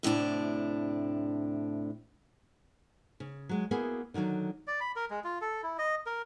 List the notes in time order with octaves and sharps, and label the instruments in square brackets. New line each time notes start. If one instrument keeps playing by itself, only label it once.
[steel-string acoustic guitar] D2 A2 C3 D4
[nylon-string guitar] C#3
F#3 G#3
A#3 B3 E4 F#4 G#4
D3 D#3 F3 F#3
[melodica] D5
B5
A#4
G#3
F4
A4
E4
D#5
A#4